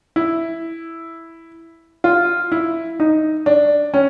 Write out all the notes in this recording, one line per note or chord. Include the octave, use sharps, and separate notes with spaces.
E4
F4
E4
D#4
D4
C#4